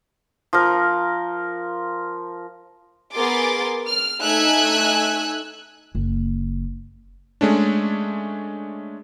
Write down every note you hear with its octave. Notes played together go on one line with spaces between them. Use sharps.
F3 A#4
B3 G#4 A#4 C6 D6 A6
F6
A3 D#4 G#5 E6 F#6 G#6
F#1
G#3 A3 C#4 D4